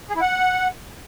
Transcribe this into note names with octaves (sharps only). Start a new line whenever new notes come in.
G#4
E4
F#5